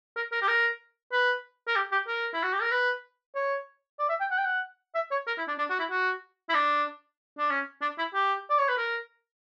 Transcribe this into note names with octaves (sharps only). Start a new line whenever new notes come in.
A#4
A#4
G4
A#4
B4
A#4
G4
G4
A#4
E4
F#4
G4
A#4
B4
C#5
D5
E5
G5
F#5
G5
F#5
E5
C#5
A#4
E4
D4
D4
F#4
E4
F#4
E4
D4
D4
C#4
D4
E4
G4
D5
C#5
B4
A#4